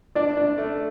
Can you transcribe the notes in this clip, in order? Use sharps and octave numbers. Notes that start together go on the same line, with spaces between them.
D4 D5
D4
A3